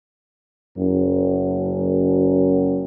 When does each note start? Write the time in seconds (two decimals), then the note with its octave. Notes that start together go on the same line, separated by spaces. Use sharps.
0.76 F#1 F#2